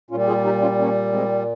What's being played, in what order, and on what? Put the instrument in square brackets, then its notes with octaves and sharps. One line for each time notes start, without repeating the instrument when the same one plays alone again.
[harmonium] A#2 C#4 F4
G3
F4 G#4
D#4 G4
C#4 F4
A#3 C#4
G#3 C4